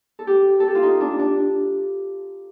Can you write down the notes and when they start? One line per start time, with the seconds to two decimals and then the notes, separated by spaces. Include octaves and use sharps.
0.19 A4
0.27 G4
0.60 A4
0.68 G4
0.75 F4
0.83 D#4
1.01 D4
1.19 D4